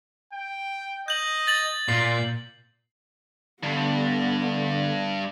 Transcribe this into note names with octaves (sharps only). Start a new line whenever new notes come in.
G5
D#5 G6 F#7
A6 F#7
A#2 F4 C7
G2 D3 B3